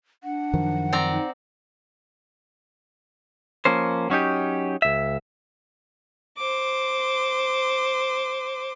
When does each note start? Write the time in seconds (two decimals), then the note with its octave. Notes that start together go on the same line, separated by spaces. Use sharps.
0.24 D4 F#5
0.53 F#2 D#3 F3
0.93 C4 D5 A#5
1.12 D#4
3.65 F3 A#3 C#4 C5
4.10 F#3 C#4 D#4 G4
4.82 C#2 E5
6.38 C5 D6